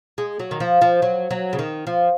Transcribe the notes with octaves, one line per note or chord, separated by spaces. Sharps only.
G#3
F#3
D#3
F3
F3
F#3
F#3
C#3
D#3
F3